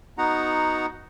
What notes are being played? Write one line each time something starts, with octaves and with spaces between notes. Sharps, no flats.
B3 D#4 F#4 F#5 A#5